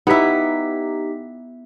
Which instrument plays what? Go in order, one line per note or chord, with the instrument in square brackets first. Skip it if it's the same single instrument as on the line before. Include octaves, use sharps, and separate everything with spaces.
[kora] B3 E4 [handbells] D#4 G4 B6